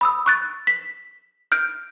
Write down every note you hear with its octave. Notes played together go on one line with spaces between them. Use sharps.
B5 D#6 E6
C#6 F#6 A6
B6
F6 G6 D7